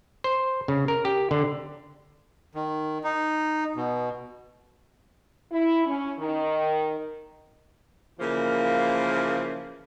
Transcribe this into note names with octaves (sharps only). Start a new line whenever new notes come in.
C5
C#3
A#4
G4
D3
D#3
D#4
B2
E4
C#4
D#3
C#3 E3 F3 A#3